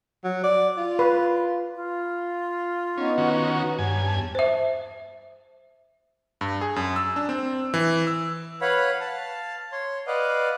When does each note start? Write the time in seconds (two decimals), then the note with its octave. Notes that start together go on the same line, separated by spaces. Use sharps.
0.24 F#3
0.44 D5
0.77 F4
0.99 B4
1.75 F4
2.98 B3 C#4 D#4
3.18 D#3 C#4 F#4
3.79 G2 C#5 G#5
4.07 E2 A5
4.35 C5 E5
6.41 G2
6.61 G#4
6.76 F#2
6.96 E6
7.16 D4
7.29 C4
7.74 E3
8.07 E6
8.61 B4 C#5 F5 F#5 B5
9.01 F5 A5
9.72 C#5 C6
10.07 B4 D5 D#5 F5 F#5